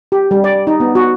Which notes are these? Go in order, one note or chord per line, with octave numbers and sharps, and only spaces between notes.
G4
G3
D5
D#4
B3
F#4